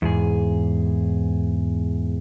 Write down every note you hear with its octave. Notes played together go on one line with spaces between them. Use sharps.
E2 G#2 G#4